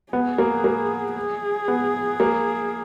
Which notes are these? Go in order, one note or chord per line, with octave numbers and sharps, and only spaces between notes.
B3 G#4
A#3
A#3
G#4
B3
A#3